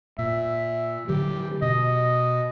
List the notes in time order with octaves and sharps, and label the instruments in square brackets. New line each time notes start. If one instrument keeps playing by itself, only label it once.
[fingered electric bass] A#2 [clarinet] E5
[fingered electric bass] D3 F#3 [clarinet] G4
[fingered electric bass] B2 [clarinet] D#5